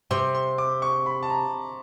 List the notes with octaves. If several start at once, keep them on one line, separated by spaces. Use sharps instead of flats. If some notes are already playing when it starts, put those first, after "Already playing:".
C3 C6
C6
D6
C#6
B5
A5
A#5